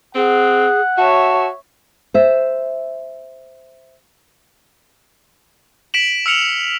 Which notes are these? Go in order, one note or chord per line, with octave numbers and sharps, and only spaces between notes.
C4 G#4 F#5
F#4 C#5 E5 A5
C5 E5
B6 D7 E7 F#7
E6 F6 C#7 F7 F#7